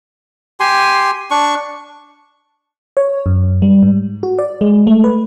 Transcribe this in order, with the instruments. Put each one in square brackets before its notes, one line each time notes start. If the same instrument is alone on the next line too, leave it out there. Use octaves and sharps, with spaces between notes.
[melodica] G4 G#5 C6
D4 C#6
[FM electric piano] C#5
F#2
G3
G#2
F#4
D5
G#3
A3
B4